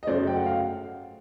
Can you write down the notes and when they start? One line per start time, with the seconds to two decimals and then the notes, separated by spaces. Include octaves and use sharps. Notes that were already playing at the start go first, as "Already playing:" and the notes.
0.03 D#5
0.07 F#2 C#3 F#3 A3 C5 D5
0.27 G5
0.36 F#5
0.46 F5